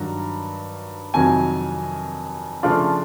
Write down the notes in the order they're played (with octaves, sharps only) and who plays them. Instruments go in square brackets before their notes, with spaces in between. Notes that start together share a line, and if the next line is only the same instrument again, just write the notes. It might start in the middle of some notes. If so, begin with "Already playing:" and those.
Already playing: [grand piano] G2 D#3 F#3 A#5
F2 C3 D#3 F#3 G#5
C#3 F3 A3 D4 F4